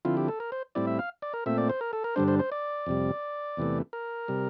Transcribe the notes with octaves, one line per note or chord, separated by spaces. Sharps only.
D3 F3 C4 E4 F4
G4
A4
A#4
C5
A2 G3 C4 E4 D5
E5
F5
D5
A#4
A#2 A3 C4 E5
D5
C5
A#4
A4
A#4
G2 D3 G3 D4 C5
C5
C5
D5
F2 C3 G3
E2 C3 E3 A3
A#4
C3 G3